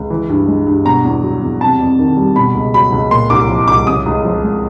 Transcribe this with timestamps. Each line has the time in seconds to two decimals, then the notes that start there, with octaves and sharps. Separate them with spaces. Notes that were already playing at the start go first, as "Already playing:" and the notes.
Already playing: C#2
0.10 E3
0.29 G2
0.48 G#3
0.67 G2
0.85 B2 A#5
1.05 E2
1.23 F#3
1.42 E2
1.61 C3 A5
1.80 F2
1.99 D#3
2.17 G3
2.36 B2 B5
2.55 C#2
2.74 F#3 B5
2.92 C#2
3.11 A#2 C6
3.30 C2 D6
3.49 F3
3.68 C2 D6
3.86 C#3 D#6
4.06 C#2
4.24 F3
4.43 G#3